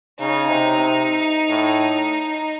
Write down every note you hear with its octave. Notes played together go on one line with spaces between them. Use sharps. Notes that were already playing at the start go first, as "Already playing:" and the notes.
C#3 D#4
C3
C3
A2